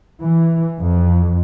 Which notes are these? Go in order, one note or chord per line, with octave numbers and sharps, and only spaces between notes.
E3
F2